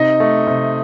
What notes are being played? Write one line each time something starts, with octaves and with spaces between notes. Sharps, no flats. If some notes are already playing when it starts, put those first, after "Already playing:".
Already playing: C3 D#4 D#5
A3
C3